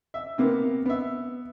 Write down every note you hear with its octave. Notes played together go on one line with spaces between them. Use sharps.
E5
C3 A#3 B3
B3 E5